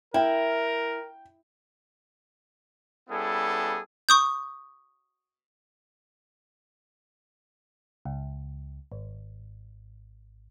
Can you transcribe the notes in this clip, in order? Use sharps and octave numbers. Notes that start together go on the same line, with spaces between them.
E4 A#4 G5
G3 B3 C#4 E4 G#4 A4
C#6 D#6 G6
C#2
G#1